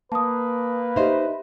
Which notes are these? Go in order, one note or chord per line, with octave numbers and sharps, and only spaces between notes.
A#3 B4 A5 D#6
D#4 G4 C5 D#5 E5